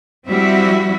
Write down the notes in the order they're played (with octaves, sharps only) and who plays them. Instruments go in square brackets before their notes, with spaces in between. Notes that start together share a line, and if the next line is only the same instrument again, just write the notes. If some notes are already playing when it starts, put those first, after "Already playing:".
[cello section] F3 G3 C4 E4 F#4 E5